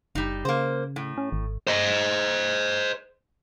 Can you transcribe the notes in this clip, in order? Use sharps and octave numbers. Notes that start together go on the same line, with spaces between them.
F#1 G3 D#4
C#3 A#3 C5
A2
C#4
G#1
C5 D#5